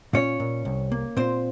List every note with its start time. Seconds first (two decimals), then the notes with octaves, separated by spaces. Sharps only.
0.13 A#2 C#4 C#5
0.40 A#2
0.65 C2
0.92 A#3
1.16 A#2 C4 C5